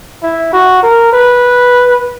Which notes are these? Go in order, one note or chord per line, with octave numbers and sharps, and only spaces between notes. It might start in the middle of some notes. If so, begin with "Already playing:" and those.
E4
F#4
A#4
B4